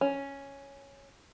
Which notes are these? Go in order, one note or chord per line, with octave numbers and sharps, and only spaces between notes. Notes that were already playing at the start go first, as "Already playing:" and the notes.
C#4